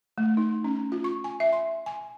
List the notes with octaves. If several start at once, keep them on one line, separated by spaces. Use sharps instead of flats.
A3
D#4
C#4
F4
C#6
G#5
E5
C6
G#5